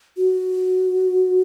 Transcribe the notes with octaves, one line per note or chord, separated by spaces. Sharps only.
F#4